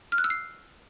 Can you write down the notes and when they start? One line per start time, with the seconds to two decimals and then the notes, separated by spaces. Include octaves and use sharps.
0.12 F6
0.18 F#6
0.24 E6
0.30 C7